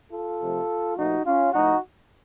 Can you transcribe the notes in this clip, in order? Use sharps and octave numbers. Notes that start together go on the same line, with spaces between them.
F4 A4
C3 F3 A3
A#2 F3 A3 D#4 F#4
C#4 F4
A2 F3 A3 D#4 F#4